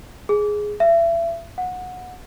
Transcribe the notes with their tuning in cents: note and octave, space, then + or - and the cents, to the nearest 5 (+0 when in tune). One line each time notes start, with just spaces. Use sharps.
G#4 +5
E5 +35
F#5 -20